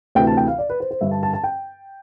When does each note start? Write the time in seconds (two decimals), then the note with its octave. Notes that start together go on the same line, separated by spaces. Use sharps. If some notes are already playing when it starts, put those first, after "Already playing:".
0.15 D2 C3 E3 G5
0.27 A5
0.37 G5
0.48 F5
0.58 D5
0.69 B4
0.80 C5
0.91 C5
1.01 G2 D3 E5
1.11 A5
1.23 A5
1.33 A5
1.44 G5